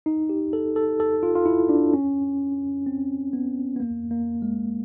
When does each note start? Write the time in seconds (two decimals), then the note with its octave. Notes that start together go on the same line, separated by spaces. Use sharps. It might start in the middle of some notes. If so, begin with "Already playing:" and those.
0.06 D#4
0.29 G4
0.53 A4
0.76 A4
1.00 A4
1.23 F4
1.35 F4
1.46 E4
1.69 D4
1.94 C#4
2.86 C4
3.33 B3
3.76 B3
3.80 A#3
4.11 A#3
4.42 G#3